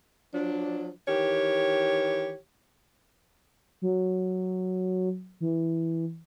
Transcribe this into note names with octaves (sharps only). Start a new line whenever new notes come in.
F3 F#3 D4
D#3 E3 G4 C#5
F#3
E3